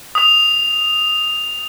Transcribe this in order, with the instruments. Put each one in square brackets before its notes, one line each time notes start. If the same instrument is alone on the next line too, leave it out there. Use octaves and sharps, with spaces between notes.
[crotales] D#6 F7